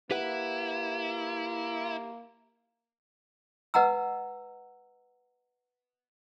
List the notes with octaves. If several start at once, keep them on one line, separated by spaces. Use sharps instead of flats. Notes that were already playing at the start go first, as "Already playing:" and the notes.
A#3 E4 G4 B4 F#5
B4 D#5 F#5 A#5 E6